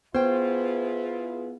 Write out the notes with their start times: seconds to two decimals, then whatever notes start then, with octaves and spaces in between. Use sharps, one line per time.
0.15 B3 E4 F4 G#4 B4 C5 G5